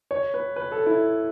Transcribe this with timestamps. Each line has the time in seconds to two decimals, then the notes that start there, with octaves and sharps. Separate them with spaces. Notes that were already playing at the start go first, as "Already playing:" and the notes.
0.11 C#5
0.34 B4
0.56 B4
0.72 A4
0.86 E4